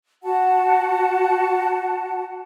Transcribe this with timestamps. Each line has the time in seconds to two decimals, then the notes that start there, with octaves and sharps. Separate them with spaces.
0.23 F#4 F#5 A5